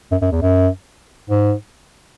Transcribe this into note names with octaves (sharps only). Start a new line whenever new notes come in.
F#2
F#2
E2
F#2
G#2